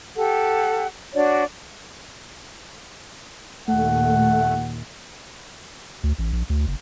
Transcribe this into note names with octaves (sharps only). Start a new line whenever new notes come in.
G4 A4 F#5
D4 F#4 C#5 D5
D#2 A#2 A3 F#5
D2
A1
A#1
D2
F#1